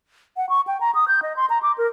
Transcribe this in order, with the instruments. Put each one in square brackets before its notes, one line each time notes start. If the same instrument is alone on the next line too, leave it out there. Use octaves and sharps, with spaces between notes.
[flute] F#5
C#6
G5
A#5
D#6
G6
D#5
C6
A#5
D6
A#4